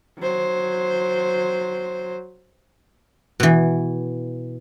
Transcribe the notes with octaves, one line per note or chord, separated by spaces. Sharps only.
F#3 C5
B2 E3